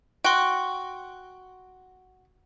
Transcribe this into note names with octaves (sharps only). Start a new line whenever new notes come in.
F#4 G5 C6